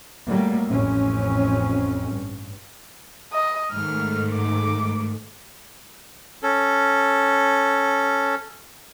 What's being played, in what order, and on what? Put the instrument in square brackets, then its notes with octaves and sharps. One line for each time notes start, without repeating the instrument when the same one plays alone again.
[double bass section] F#3 G3 A3 A#3
A1 F2 C4 C#4
G2
[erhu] D#5
[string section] G#2 D#3 A3 [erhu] F6
[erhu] D6
[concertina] C#4 A4